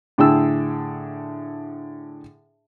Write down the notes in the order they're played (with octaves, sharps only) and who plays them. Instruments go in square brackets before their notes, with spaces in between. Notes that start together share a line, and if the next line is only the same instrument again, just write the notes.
[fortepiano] A2 D3 G#4 G5 A5 E6